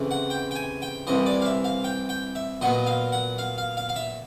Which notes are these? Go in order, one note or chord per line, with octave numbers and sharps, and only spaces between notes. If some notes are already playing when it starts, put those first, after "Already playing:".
Already playing: C#2 C3 E3 A3
F#5
G5
G5
G#5
G5
C2 C3 E3 D#5
D5
F5
E5
F5
G5
G5
E5
A#2 F#3 B3 D#5
F5
F#5
F5
F5
F5
F5
E5